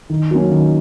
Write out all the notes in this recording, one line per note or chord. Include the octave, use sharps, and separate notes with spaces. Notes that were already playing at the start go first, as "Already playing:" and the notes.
D#3
F#3 A#3 C#4
D#3